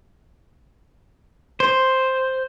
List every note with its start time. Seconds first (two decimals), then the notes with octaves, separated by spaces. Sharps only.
1.60 C5